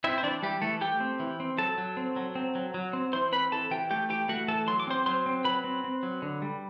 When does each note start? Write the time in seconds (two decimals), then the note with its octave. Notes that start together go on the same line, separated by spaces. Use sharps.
0.04 C4 E4 E5
0.18 C5
0.23 E3 D4 D5
0.42 E3 G3 G4
0.62 E3 A3 A4
0.81 A3 G4 G5
1.00 C4
1.20 E3
1.40 C4
1.58 F#3 A4 A5
1.78 F#3
1.97 C4
2.16 F#3
2.35 C4
2.55 F#3
2.74 F#3
2.93 C4
3.13 E3 C5 C6
3.32 C4 B4 B5
3.52 E3 A4 A5
3.71 E3 G4 G5
3.90 A3 G4 G5
4.09 E3 G4 G5
4.29 A3 F#4 F#5
4.48 E3 A4 A5
4.67 F#3 C6
4.80 D6
4.87 C4 C5 C6
5.06 F#3 C5 C6
5.26 C4
5.44 F#3 B4 B5
5.64 C4
5.84 C4
6.03 F#3
6.22 D3
6.42 G3